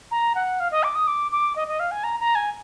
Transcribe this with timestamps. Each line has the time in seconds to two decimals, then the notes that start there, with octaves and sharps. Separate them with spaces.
0.11 A#5
0.35 F#5
0.60 F5
0.71 D#5
0.83 D6
0.95 D#6
1.07 D6
1.32 D6
1.56 D#5
1.68 D#5
1.80 F5
1.91 G#5
2.04 A#5
2.20 A#5
2.35 G#5